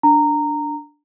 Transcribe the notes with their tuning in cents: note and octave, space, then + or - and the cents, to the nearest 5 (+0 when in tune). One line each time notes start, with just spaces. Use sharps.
D4 +0 A#5 -15